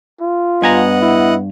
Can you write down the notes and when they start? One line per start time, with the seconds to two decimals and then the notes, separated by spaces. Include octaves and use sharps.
0.21 F4
0.62 G2 B3 D#5 F#5 G#5 A#5
1.02 E4